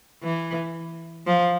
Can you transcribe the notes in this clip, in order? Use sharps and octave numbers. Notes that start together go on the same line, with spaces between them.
E3
F3